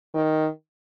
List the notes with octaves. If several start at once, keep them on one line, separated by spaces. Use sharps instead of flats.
D#3